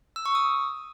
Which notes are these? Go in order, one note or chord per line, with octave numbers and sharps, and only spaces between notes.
E6
C#6
D#6